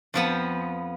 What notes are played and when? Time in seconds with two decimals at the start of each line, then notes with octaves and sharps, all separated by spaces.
0.14 F2 F3 B3